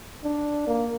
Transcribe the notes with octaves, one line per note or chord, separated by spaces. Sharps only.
D4
A#3